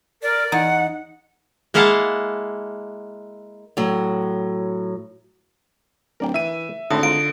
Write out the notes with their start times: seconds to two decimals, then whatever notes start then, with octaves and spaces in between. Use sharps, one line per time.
0.22 A#4 D5
0.52 E2 D#4 F#5
1.74 G#3 A#3 E4 F5 F#5 A5
3.77 A2 F#3
6.20 D1 A#4 D5 G5
6.34 E3 E5 D#7
6.90 G#1 A2 D3 D#6 A#6
7.03 D#4 F4 D7